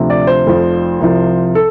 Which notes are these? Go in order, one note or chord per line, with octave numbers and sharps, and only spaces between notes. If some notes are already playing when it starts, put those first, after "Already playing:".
Already playing: D2 C3 F3
D5
C5
F1 F2 F3
C2 C3 F3
A4